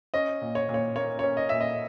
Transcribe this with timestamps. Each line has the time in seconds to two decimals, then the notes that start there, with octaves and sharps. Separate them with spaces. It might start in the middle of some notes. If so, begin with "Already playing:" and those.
0.14 C#4 D#5
0.42 A#2
0.55 C#5
0.69 A#2
0.74 C#5
0.96 A#3 C#5
1.19 C#5
1.24 C#4
1.37 D#5
1.49 A#2 E5
1.61 D#5